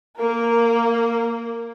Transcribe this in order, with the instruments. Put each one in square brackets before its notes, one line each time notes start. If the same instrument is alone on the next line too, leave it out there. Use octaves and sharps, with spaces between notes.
[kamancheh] A#3 A#4